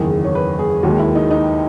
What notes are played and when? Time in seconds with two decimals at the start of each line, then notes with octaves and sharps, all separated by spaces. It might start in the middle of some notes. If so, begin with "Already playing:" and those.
Already playing: F#1 E2 D#3 G#4
0.24 C#5
0.35 B4
0.59 G#4
0.83 D#2 D#3 G#3 F#4
0.99 E4
1.15 D#4
1.31 D#4